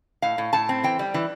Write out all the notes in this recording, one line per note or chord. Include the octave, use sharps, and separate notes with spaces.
A2 F5
A2
A2 A5
C4
E3 G5
G3
E3